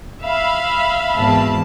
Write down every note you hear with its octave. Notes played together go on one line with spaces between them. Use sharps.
E5 F5 B5
G#1 E2 A5